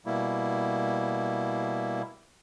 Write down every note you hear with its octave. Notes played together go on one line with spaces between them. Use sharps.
B2 G3 A#3 E4